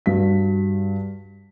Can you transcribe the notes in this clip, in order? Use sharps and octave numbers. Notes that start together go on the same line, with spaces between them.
G2 F#4 B6